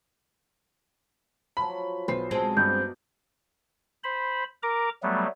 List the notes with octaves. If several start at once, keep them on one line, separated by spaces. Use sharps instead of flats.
F3 F#3 B5
B1 B4 C5 C7
B2 G#3 C4 A5
G2 D#4 D5 G6
C5 B5
A#4 A#5 D6
F#3 G3 A3 B3